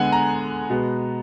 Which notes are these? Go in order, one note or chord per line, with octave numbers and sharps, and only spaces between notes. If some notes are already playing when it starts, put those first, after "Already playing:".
Already playing: D3 G#3 B3 F#5 G#5
A#5
B2 G#3 B3